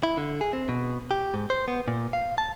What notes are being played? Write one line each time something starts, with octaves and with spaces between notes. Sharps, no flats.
E4
D3
G#4
C4
B2
G4
G#2
C5
B3
A#2
F5
A5